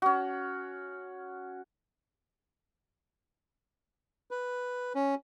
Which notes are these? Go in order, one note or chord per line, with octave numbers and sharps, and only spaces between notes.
C#4 F#4
B4
C#4